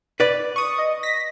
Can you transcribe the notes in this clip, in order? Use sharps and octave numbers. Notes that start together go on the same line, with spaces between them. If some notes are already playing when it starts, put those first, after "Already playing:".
B4 D5
C#6 D#6
D#5
A#6 B6